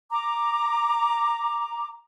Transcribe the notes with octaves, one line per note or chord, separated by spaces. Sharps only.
A#5 D6